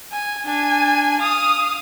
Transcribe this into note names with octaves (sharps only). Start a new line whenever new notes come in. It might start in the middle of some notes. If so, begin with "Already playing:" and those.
G#5
D4 G#5
F5 D#6